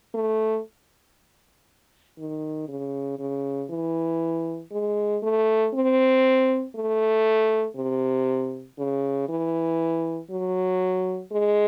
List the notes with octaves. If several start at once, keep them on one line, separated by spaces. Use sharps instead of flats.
A3
D#3
C#3
C#3
E3
G#3
A3
C4
A3
C3
C#3
E3
F#3
G#3